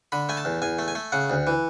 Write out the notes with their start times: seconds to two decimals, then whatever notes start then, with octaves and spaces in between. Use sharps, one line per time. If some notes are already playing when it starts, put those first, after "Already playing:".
0.12 D3 B5
0.29 A3 G#5
0.37 A5
0.45 E2
0.62 E2 G#5
0.79 A3
0.88 G#5
0.95 A3
1.12 C#3 F#5
1.30 D2
1.47 E3